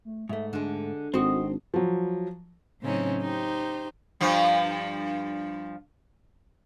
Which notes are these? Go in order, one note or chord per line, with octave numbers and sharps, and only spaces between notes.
A3
G#2 A3 E5
D3 G#3 D4
G#1 C4 F#4 D#5
F3 F#3
A2 C#3 F#3 C4 C#4 D#4
D#4 G4 C5
G2 F3